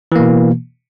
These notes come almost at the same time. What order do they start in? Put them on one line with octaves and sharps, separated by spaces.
E3 A#3 B2